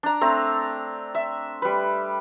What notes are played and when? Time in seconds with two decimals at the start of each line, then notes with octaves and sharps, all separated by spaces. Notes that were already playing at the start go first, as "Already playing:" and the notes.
0.03 D4 A#5
0.21 A3 C4 A#5
1.15 E5
1.62 G3 B4